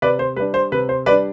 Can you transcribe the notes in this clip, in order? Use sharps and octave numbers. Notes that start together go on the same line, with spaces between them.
C3 B4 D5
C5
G3 D4 B4
C5
C3 B4
C5
G3 D4 B4 D5